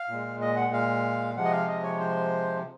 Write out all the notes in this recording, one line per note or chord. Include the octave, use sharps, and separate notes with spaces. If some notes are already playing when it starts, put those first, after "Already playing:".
Already playing: F5
A#2 G#3
D#5
F#5
F5
C3 F3 G#3 F#5
D#5
F5
D#5
C#5
C5